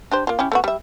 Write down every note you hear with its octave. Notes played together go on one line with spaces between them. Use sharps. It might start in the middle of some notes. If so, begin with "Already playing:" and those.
D4 G4 C5
A#3 F4
C#4 E4 G4
A3 B3 F#4
G3 E5